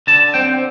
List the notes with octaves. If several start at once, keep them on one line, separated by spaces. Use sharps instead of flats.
D3 A5
C4 G5